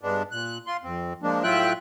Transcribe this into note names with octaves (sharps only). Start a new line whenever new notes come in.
G2 G#3 B3 D4
A#2 F#6
F4 C6
F2 C4
F3 G#3 A#3 D4
A2 F#3 F4 E5 G5 F#6